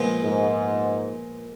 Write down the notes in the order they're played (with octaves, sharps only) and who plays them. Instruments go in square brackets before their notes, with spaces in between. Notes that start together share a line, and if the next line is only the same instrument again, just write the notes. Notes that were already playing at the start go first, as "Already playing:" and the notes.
Already playing: [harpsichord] A#2 F3 G#3 B3 F4
[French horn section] G#2